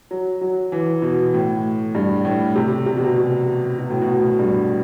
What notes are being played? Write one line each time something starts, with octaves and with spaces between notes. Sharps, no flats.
F#3
F#3
E3
B2
A2
G2
A2
C3
C3
B2
C3
B2
A2
B2
G2